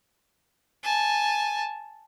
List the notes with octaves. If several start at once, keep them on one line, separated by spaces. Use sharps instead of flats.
G#5 A5